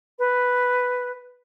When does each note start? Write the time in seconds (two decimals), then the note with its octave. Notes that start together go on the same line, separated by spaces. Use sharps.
0.19 B4